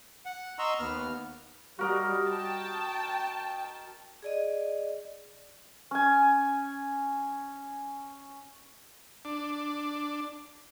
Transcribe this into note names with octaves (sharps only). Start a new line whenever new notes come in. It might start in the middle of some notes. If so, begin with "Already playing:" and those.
F#5
D#5 A#5 C6 C#6 E6
D#2 B3 F6
G3 F#4 A#4 D#5
G5 A5
G#4 D5 D#5
C#4 G#5
D4